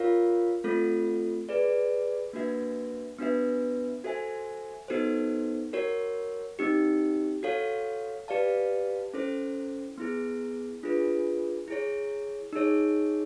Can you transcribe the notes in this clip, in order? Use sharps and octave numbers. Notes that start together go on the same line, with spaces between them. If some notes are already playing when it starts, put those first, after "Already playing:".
Already playing: F4 A#4 C#5 F5
A3 C4 F4 A4
G#4 B4 D5
A#3 D4 F#4 B4 E5
B3 D4 F#4 B4 E5
F#4 A4 C5 E5 G#5
B3 D#4 F#4 A4 C5
F#4 A#4 C#5
C4 D#4 G4
F#4 A4 C#5 F5
G4 B4 D5 F5 A5
C#4 E4 A4 C5
B3 E4 G#4
D4 F4 G#4 B4
E4 G#4 C#5
D#4 G#4 C#5